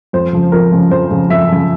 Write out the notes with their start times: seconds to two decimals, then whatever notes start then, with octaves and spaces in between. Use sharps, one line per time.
0.13 F2 C5
0.33 C#3 F3
0.52 F2 A#4
0.72 C#3 F3
0.91 F2 C5
1.10 C#3 F3
1.30 F2 E5
1.49 C#3 F3